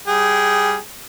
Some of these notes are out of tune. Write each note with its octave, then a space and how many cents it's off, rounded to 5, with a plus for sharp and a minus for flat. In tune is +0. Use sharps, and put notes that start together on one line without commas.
G3 +0 G#4 +0 G5 -20